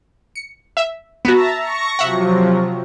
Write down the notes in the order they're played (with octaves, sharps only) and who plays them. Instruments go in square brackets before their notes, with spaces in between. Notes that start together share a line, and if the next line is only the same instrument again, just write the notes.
[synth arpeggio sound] C#7
E5
[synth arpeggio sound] B3 F#4 [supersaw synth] E5 A5 A#5
[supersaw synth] C#6 A#6 C#7
[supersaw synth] C3 F3 F#3 [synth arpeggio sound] E5 F#5